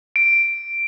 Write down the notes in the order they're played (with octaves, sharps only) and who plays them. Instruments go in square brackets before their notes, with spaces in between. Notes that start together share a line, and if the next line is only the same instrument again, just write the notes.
[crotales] D7